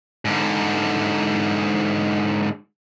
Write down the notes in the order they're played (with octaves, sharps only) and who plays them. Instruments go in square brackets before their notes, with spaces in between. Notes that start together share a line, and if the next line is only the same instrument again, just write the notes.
[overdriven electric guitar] G#2 D3